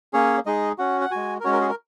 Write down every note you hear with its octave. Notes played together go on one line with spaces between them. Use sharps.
A#3 C#4 G#4 C#5
G#3 D#4 G#4 D#5
C#4 F#4 F#5
F#5
G#3 F#4 G#5
A#4
G#3 C#4 F#4 C#5
A#4
G#4
A#4